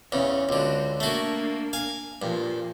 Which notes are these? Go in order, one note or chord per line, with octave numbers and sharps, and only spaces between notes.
E2 C#3 C#4
C#2 D3 C4 F#4
A3 A#3 D4 F#4
F5 G#5
G2 A#2 F3